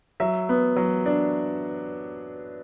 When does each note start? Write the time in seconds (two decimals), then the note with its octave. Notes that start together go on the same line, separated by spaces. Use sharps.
0.20 F#3 E5
0.49 B3
0.76 F#3
1.06 D4